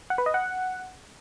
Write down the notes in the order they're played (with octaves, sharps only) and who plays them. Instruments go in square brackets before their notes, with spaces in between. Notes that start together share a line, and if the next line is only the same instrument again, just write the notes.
[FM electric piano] F#5
B4
D#5
F#5